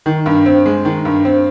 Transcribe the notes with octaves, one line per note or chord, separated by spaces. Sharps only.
D#3
G2
C4
G#3
D#3
G2
C4